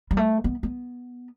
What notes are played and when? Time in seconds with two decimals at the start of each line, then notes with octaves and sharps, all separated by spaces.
0.11 G3
0.17 A3
0.44 B3
0.63 B3